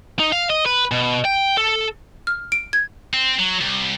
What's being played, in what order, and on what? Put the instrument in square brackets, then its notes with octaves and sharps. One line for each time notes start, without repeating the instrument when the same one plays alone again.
[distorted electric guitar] D#4
F5
D#5
B4
B2
G5
A4
[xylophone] F6
D7
G#6
[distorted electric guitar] C4
F#3
C2